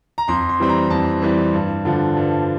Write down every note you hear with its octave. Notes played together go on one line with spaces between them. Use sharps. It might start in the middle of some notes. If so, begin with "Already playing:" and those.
A#5
F2 C6
C6
E3 G3 C4
A#5
F2 A5
E3 G3 C4
G2
D3 F3
G2